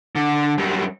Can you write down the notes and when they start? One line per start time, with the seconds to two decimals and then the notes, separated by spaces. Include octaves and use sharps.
0.15 D3
0.58 F#2 G3